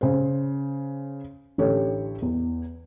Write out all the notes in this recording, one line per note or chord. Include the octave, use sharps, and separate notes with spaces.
C#3 C5
A1 D3 G4 A4 C#5
E2